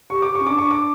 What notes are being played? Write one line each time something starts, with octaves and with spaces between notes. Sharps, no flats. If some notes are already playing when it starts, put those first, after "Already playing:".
G4 C#6
D6
G4
C#6
C#4
D4 D6
D4 C#6
D6